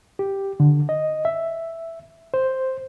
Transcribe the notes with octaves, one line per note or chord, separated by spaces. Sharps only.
G4
D3
D#5
E5
C5